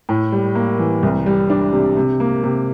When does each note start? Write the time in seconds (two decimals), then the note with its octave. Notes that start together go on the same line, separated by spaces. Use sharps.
0.09 A2
0.32 G3
0.55 A#3
0.79 E3
1.03 C2
1.26 G3
1.50 D4
1.73 C3
1.97 C3
2.20 A#3
2.44 C3